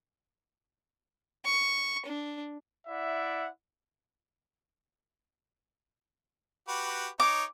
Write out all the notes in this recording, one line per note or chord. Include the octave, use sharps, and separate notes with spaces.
C#6
D4
E4 D5 E5 F#5
F#4 G4 B4
D#4 C#5 D6